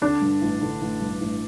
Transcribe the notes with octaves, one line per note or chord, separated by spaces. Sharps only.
D3 D4
G2
A1
D3
A1
G2
A1